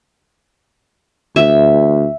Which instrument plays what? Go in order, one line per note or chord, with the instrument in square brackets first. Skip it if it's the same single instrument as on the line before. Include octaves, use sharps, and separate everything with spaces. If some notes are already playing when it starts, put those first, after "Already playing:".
[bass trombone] D2 [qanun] E5